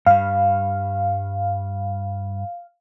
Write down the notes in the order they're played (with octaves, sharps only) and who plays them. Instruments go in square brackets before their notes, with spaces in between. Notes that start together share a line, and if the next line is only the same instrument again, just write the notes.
[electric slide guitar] G2 G3 [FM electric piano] F5